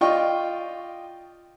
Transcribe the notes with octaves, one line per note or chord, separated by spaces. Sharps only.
F4 D5 D#5 G5 C#6